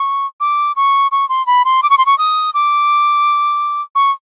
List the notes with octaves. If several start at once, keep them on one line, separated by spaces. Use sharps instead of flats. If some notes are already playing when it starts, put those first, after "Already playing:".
Already playing: C#6
D6
C#6
C#6
C6
B5
C6
D6
C#6
C6
C#6
D#6
D6
C#6